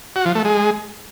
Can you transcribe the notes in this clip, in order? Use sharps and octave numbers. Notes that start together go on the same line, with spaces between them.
F#4
F3
A3
G#3